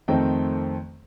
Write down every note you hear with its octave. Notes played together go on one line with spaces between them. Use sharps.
F2 D#3 A3 C4 D#5 G5